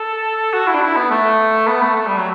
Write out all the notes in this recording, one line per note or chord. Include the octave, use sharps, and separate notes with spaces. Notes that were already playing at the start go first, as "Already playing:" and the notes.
Already playing: A4
F#4
E4
D4
E4
B3
A3
B3
A3
A3
G3
F#3